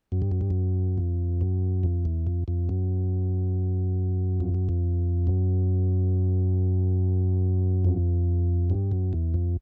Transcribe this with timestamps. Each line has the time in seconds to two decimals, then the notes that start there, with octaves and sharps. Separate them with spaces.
0.12 F#2
0.22 G2
0.31 F#2
0.41 G2
0.50 F#2
0.98 F2
1.41 F#2
1.83 F2
2.05 E2
2.27 F2
2.48 F2
2.69 F#2
4.40 F2
4.54 F#2
4.69 F2
5.27 F#2
7.85 F2
8.70 G2
8.92 F#2
9.13 E2
9.34 F2